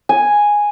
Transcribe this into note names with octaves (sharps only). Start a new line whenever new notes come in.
G#5